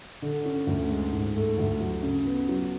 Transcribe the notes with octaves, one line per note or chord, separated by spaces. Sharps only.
D3
C#4
D2
G#3
G#2
A3
D2
F#3
C#3
B3
F#3